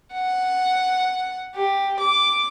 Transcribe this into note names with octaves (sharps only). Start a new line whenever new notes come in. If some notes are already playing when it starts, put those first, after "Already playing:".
F#5
G4
D6